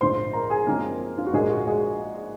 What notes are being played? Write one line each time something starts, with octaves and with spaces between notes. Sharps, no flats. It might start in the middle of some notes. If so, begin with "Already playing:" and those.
A#1 G#2 F3 C5 C6
A#4 A#5
G#4 G#5
F#2 F3 G#3 A#3 C4 A#4
F4
F#4
A#1 G#2 F3 G#3 A#3 G#4
F#4
G#3 G#4